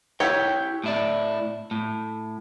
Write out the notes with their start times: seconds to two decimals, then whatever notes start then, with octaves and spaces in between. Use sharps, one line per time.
0.20 E4 G4 C#5 G5
0.84 A2 E4 D5
1.71 A2